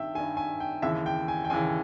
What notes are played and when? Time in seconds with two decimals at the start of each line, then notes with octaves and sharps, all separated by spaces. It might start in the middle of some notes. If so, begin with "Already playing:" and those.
Already playing: G2 D#3 E5 G5
0.15 D#3 G#5
0.18 G2
0.37 G#5
0.60 G5
0.82 D#2 C#3 E3 E5
1.06 G5
1.28 G#5
1.44 G5
1.50 D#2 C#3 E3 G#5